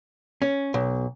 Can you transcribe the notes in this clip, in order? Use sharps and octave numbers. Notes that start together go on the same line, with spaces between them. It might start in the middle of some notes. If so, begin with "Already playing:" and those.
C#4
B1